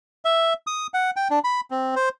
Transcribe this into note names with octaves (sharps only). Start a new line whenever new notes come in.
E5
D#6
F#5
G5
D4
B5
C4
C5